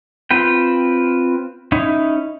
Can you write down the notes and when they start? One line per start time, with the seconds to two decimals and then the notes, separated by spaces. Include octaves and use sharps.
0.31 C4 F4 B4 G5
1.72 C#4 D#4 E4